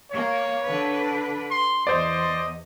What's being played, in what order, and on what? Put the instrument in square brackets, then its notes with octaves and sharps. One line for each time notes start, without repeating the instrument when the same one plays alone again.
[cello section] A#3 [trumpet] C#5
[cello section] D3 D4 B4
[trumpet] C6
[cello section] E2 [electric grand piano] C5 D5 [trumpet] D#5